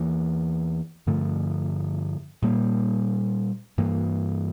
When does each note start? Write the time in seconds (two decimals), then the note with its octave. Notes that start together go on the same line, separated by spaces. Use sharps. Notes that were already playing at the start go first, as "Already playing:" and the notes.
Already playing: E2 E3 A#3
1.07 G2 D3 F3 A3
2.42 A#2 G3 A#3
3.78 G2 E3 A#3